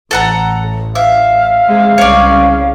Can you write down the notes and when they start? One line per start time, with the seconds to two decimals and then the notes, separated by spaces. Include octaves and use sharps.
0.11 A1 A4 F#5 A#5
0.95 E5 F5
1.68 C3 G#3
1.98 C2 C#3 C#5 D5